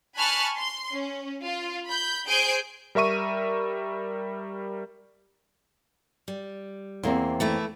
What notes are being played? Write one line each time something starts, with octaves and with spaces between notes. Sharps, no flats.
G#5 A5 B5 C#6 F6 F#6
C6
C#4
F4
B5 G6
G#4 C5 G#5 G6 D7
G3 A#4 E5 C#6 D#7
G3
E2 A#3 C4
E3 A3 E4